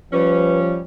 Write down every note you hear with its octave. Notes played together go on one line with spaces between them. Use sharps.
F3 G3 C#4 B4